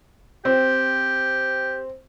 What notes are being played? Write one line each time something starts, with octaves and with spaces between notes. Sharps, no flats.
C4 G4